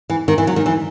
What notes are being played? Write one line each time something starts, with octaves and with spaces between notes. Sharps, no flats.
E3
D#3
E3
F#3
D#3
E3